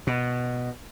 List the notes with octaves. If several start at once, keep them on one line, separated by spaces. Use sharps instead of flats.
B2